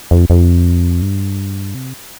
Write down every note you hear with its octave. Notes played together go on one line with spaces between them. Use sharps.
F2
F2
G2
C3